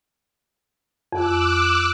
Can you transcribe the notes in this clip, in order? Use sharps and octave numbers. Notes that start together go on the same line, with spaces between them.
F2 D6 E6 F#6